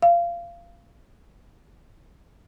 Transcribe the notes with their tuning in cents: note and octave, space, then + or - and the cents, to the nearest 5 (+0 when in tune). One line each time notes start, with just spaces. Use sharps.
F5 -20